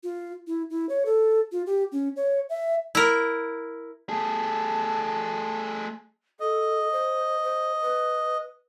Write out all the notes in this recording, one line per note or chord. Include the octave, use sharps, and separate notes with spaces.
F4
E4
E4
C#5
A4
F4
G4
C#4
C#5
E5
E4 A#4
A3 G#4 A5
A4 D#5
C5
C5
B4